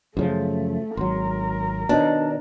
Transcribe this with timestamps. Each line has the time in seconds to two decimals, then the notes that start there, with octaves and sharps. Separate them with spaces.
0.17 F#2 C#3 F3 A3 E4
0.97 G#1 F#3 A#4 C6
1.89 B2 D#3 D4 C#5 D#5 A5